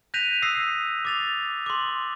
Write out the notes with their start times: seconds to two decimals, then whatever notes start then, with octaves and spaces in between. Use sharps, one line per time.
0.14 F#6 G6 A#6 B6 D#7 F7
0.42 D#6 E6 A#6 C7
1.05 D6 A6 F7
1.66 C6 D6